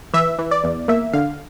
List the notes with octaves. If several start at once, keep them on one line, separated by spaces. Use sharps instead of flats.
E3 E5
E3
D5
E2
A#3 E5
D3 F5